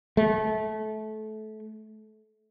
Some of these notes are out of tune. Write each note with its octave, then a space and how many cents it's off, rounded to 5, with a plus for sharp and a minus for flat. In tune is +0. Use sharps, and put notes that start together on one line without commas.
A3 -25